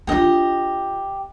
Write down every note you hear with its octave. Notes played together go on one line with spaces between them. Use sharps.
D4 F4 G4 D#5